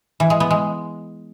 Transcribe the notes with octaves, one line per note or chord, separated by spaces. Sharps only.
E3
G#3
B3
G#3